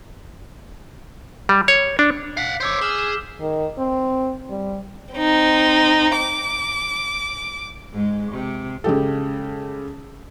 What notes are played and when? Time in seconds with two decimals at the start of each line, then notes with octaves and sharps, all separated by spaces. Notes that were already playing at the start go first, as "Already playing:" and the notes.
1.49 G3
1.68 C#5
1.99 D4
2.37 F5 F#5 B6 C7
2.60 C5 C#5 D6 E6 G6
2.82 G#4 F6 E7 G7
2.99 E7
3.40 D#3
3.78 C4
4.50 G3
5.14 C4 D#4
6.18 D6
7.93 G#2 G#3
8.32 C3
8.84 C#3 G#3 G4 A4